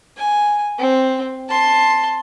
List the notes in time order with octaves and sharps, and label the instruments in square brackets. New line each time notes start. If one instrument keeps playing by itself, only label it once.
[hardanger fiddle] G#5
C4
A5 C6